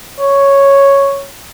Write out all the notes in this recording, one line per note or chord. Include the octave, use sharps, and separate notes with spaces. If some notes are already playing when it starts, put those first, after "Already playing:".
C#5